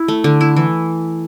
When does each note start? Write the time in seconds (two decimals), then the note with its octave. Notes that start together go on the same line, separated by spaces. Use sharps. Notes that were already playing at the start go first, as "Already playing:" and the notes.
Already playing: E4
0.08 A3
0.24 D3
0.41 E4
0.56 E3